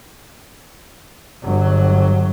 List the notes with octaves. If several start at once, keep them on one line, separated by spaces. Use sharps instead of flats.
G1 F#3